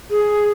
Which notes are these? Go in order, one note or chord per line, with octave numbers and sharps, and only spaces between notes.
G#4